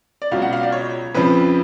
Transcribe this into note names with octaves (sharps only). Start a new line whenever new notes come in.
D5
C#2 B2 F#3 F5
F#5
F5
D5
C#5
F2 C#3 F3 B4